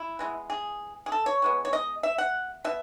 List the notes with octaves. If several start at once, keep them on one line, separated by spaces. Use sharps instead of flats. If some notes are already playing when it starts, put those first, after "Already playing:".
Already playing: E4
E3 G#3 B3
G#4
G#4
A4
C#5
E3 G#3 B3
C#5
D#5
E5
F#5
B2 E5